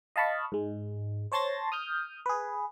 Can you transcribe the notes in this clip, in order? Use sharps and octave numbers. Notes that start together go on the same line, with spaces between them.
D#5 F5 A5 B5 C#6
G#2 G#3
C5 C#5 A5 C6 A6 A#6
D#6 F6 G6
G#4 B4